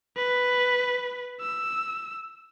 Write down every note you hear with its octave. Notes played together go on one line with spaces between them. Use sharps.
B4
E6